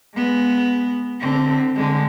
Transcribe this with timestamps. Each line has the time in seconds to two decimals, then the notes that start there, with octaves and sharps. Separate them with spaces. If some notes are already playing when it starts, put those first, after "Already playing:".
0.15 G#3 B3
1.20 D3 C4
1.75 D3 G#3